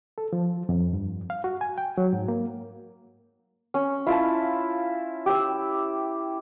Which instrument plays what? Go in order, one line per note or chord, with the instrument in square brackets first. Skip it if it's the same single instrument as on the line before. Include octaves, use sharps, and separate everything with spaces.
[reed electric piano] A4
F3
F2
G2
F5
F#4
G#5
G5
F#3
G#2
A#3
[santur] C#4
[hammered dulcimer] E4 [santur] F4 A5
[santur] G4 E6